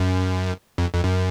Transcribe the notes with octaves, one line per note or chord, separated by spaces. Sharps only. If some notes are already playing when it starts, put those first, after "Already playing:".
Already playing: F#2
F2
F2
F#2